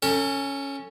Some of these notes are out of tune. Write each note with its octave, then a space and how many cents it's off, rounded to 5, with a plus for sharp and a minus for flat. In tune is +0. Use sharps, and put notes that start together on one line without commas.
C#4 +0 A4 +35